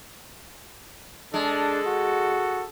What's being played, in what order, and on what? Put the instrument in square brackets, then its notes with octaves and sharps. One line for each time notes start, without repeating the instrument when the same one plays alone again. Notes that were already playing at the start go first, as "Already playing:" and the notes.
[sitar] G#3 [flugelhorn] D4 [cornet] A4
[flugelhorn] F#4